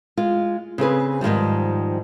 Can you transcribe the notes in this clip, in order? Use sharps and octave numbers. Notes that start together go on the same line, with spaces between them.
G#3 F4
C#3 C4 G#4 B4
G#2 D#3 F3 G3